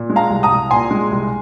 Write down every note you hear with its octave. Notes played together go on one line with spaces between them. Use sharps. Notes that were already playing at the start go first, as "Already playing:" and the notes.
Already playing: A#2
G#3
F5 A#5
C2
A#5 D#6
C2
A#2 G#5 C6
G#3
C2